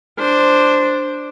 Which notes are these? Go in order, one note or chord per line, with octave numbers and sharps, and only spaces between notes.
D4 C5